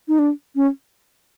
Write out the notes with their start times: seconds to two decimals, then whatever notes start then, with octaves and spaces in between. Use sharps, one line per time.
0.08 D#4
0.19 D4
0.56 C#4